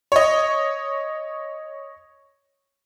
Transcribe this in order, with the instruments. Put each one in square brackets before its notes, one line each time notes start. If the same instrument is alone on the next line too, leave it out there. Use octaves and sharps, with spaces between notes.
[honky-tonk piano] C#5 D#5